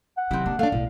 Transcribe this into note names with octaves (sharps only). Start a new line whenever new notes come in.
F#5
C3 D#3 F#3 C4 E4
A#3 D4
A3 B3 D4 F5
B1 A2 B3